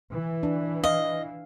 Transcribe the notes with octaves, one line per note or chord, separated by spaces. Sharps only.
E3
D4
D#5 F5